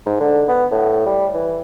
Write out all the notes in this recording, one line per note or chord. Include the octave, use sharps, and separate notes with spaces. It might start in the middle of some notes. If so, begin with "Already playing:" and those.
G#2
D3
B3
A2
G3
E3